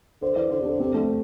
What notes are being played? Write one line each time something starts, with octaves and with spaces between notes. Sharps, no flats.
D3 C5
E3 D5
D3 C5
C3
D3 D4
C3 C4
D3 A3